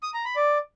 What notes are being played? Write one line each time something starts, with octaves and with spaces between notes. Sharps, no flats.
D#6
A#5
B5
D5